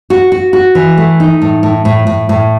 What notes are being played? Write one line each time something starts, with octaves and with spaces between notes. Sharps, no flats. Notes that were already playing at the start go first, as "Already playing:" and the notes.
F#4
F#4
F#4
E3
A3
D#4
A2
A2
A2
A2
A2